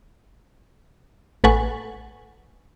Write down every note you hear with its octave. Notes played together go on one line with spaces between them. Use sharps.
A1 A4 B4 F#5 G#5 C#6